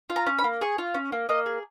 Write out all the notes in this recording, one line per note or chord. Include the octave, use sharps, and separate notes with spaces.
F4
A#5
C#4
B5
A#3
G#4 C#6
F4
C#4
A#3
A#3 D#5
G#4